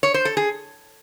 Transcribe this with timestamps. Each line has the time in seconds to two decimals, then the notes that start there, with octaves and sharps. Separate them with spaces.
0.03 C#5
0.14 C5
0.25 A4
0.37 G#4